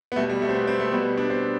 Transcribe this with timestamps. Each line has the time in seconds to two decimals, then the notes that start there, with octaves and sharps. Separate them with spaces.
0.12 B3
0.16 B2 G3 A3
0.30 G3
0.42 A3
0.49 C4
0.54 B3
0.67 C4
0.80 A3
0.92 B2 G3 B3
1.17 D4
1.30 C4